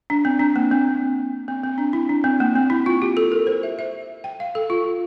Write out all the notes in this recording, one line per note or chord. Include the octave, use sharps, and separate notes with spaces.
D4
C4
D4
A#3
C4
C4
C4
D4
E4
D4
C4
A#3
C4
E4
F4
G4
A4
A#4
C5
E5
E5
G5
F5
A4
F4